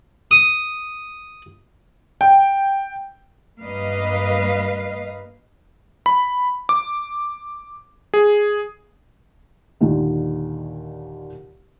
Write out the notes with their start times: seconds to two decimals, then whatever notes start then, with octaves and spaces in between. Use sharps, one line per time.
0.31 D#6
2.21 G5
3.61 G2 A#3 B4 D#5 F5
6.06 B5
6.69 D6
8.14 G#4
9.81 D#2 A#2 D3 D#3